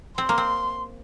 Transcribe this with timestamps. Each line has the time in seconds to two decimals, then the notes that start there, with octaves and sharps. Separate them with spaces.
0.18 C4 C6
0.29 A#3
0.38 C4